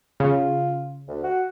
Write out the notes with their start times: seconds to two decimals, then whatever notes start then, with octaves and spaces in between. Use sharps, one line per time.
0.20 C#3 F4
1.08 D2
1.24 F#4